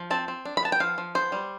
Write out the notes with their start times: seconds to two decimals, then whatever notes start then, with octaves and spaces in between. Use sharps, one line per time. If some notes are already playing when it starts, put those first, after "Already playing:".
Already playing: F3
0.10 C4 A5
0.28 C4
0.45 D4
0.57 B5
0.63 B3 A5
0.72 G5
0.80 F3 F5
0.98 F3
1.15 B3 C5
1.32 G3